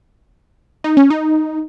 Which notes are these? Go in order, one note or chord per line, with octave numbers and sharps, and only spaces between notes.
D#4
C#4
D#4